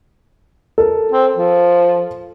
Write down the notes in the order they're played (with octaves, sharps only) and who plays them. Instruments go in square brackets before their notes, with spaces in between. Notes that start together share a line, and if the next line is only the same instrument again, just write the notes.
[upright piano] A4 A#4
[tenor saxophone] C4
F3